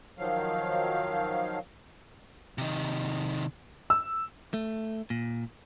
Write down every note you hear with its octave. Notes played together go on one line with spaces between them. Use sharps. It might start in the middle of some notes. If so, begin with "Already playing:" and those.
D#3 F3 F#3 F5
C3 D#3
E6
A3
A#2